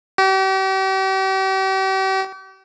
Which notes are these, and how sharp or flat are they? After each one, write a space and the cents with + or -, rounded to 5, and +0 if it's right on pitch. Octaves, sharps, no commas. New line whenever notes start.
G4 -40